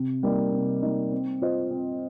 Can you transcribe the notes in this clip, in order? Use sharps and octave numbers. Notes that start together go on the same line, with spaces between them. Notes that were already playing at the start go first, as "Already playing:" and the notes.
Already playing: C3
G3 A#3 D#4
C3
G3 A#3 D#4
C4
F4 C5 D#5
C4